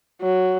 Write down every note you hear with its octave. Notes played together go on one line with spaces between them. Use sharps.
F#3